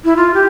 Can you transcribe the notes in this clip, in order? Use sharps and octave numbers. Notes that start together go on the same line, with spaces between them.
E4
F4
G4